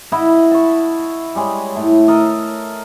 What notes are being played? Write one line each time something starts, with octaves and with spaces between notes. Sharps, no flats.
E4 D#5 F#5 B5
A5 C#6
G3 G#3 G#4 C#5
A2
A4 A#4 D#5